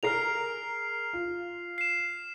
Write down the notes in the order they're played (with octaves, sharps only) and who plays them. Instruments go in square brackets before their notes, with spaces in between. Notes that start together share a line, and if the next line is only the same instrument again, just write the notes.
[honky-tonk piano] G#4 A#4 A#5 [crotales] F6 C7 F7
[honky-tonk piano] F4
[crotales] C7 E7